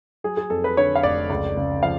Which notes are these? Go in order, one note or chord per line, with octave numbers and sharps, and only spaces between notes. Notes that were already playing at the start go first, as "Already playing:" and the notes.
F#3 G#4
G#4
F2 A4
B4
D3 C#5
F5
F1 D5
C#2
C#3
F3 F5